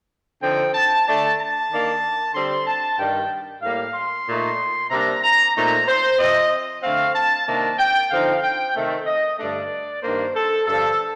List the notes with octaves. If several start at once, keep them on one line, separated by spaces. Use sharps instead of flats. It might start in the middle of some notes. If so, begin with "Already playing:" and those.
D3 F3 C4 D#4 G5
A5
D3 A3 D4 A5
A5
D#3 A#3 D4
D3 G3 C4 C6
A5
G2 D#3 G3 G5
A2 G3 A#3 F5
C6
A#2 A3 D#4
C3 G3 A#3 D4 A#5
A#5
A#2 A3 C4 D#4 A#5
C5
C3 F3 C4 D#5
D3 A3 C4 F5
A5
C3 D#3 A#3 D4 A5
G5
D3 F3 C4 D#4 F5
G5
C3 D#3 A3
D#5
G2 D3 A3 D4 D5
G2 D#3 A#3 D4 C5
A4
G2 D3 F3 A4